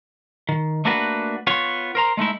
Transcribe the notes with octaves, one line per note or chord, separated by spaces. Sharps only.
D#3
A3 A#3 D4 F#4 B4
B3 F4 C#5
A#4 C5 A#5
G#3 A3 D#4 E4